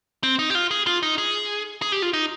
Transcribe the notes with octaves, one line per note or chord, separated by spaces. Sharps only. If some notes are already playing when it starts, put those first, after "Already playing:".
C4
D#4
G4
F4
G#4
F4
D#4
G#4
G#4
G4
F4
D#4